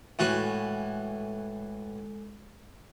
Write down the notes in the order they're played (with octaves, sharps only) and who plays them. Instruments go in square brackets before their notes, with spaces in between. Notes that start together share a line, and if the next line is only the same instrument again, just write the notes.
[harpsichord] A2 E3 F#4 [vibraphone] G#3 A4